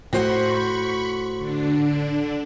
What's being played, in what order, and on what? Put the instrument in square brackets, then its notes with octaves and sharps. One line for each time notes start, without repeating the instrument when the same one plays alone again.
[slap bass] A2 [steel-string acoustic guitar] F#4 C5 F#5 [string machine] B5 C#6
[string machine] D3 D4